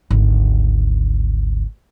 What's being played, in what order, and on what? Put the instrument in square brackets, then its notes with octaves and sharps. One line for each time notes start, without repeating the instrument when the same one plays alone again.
[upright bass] G#1 D2